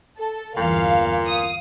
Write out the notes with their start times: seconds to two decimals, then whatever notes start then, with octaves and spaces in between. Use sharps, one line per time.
0.19 A4
0.57 G1 E2 A#2 F5
1.27 F5 D#6